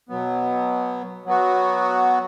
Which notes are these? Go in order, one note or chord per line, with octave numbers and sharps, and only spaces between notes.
B2 F#3 B3
F#3 B3 F#4